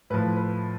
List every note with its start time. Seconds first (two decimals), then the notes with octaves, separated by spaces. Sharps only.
0.10 A2 F3 B4
0.37 B4